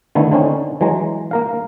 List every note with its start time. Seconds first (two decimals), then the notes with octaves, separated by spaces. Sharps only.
0.15 D3 D#3 A3 B3 E4
0.32 D3 C4 C#4 D#4
0.81 E3 F#3 G#3 A#5
1.31 A#3 A#4 F5